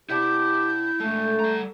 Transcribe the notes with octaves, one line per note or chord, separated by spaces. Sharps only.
C3 B3 D4 E4 G4 G6
G#3 A3 D4 A4
G3 A#5